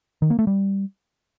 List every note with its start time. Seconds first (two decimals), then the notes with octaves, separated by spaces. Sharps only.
0.22 D#3
0.30 A#3
0.39 A3
0.47 G3